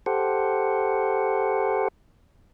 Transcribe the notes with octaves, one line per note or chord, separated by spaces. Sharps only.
G4 A4 C5 F#5